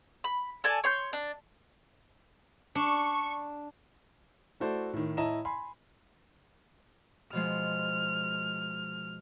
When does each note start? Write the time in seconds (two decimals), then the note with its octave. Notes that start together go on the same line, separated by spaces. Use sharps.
0.24 B5
0.64 A4 D5 G#5 A5
0.84 C#5 C6 G6
1.13 D4
2.75 D4 C#6
4.60 A3 E4 F#4 A4 C5 D5
4.93 A2 D#3
5.17 A2 E4 D#5 A5 A#5 E7
5.45 G#5 B5 C6
7.33 B2 F3 G#3 F6